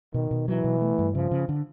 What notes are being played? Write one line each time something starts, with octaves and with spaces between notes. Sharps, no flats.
B2 D#3
B2
E3 F#3
B2
A3
G2
C#3 F3
C#3
D3